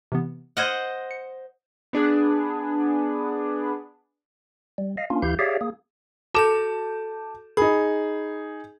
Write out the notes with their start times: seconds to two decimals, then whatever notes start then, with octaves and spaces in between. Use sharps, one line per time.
0.12 C3 E3 B3
0.57 C5 D#5 F#5 F6 G#6 D#7
1.11 C#7
1.93 B3 D4 G#4 B4
4.78 G3
4.97 D#5 F5
5.10 A#3 C#4 D4 F4
5.22 D2 E3 E4 G4 F5 G6
5.39 G4 G#4 C#5 D5 E5 F5
5.61 A#3 G#4
6.34 F#4 A4 A5 D6 G6 E7
7.57 D#4 G#4 B5